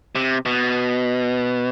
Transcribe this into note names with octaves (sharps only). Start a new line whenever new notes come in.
C3
B2